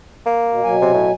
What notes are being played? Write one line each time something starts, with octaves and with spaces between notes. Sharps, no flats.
A#3
B2
B2 F#3 G#5
C3
A2